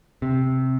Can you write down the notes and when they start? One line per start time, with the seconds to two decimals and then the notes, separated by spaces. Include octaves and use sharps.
0.22 C3